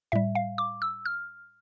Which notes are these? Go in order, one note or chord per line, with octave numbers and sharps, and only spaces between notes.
A2 G3 E5
F5
D6
E6
F6